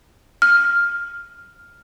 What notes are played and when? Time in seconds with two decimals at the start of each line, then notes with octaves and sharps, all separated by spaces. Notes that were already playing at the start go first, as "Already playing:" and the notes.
0.42 F6